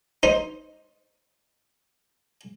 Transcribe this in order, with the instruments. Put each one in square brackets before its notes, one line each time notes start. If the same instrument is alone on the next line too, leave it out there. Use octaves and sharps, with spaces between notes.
[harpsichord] D#4 C5